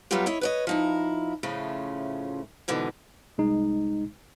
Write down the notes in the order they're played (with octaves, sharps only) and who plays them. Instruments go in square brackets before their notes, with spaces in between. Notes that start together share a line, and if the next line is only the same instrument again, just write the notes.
[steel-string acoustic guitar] F#3 G3 A3 B3 F4 G4
E4 C#5 D#5
B4 C#5 D#5
F3 D#4 E4
A2 C#3 F3 A3 C#4 F4
G#2 B2 D3 E3
[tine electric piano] C2 G#3 D#4